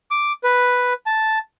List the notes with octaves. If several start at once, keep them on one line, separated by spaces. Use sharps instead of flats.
D6
B4
A5